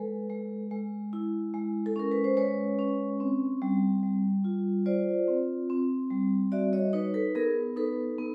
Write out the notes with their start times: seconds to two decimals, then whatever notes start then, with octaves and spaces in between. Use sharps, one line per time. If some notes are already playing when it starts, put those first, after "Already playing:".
Already playing: G#3 A4 B4
0.29 G#3
0.71 G#3
1.13 E4
1.54 G#3
1.86 A4
1.96 C#4 A#4
2.12 B4
2.24 C5
2.37 G#3 B4 C#5
2.79 C#4
3.20 C4
3.62 G3
4.03 G3
4.44 F4
4.86 F4 C5 D5
5.28 C4
5.70 C4
6.11 G3
6.52 F#4 D5 E5
6.73 C#5 D#5
6.93 D#4 B4 C#5
7.14 A4 B4
7.35 B3 G#4 A#4
7.76 D#4 A4 B4
8.18 B3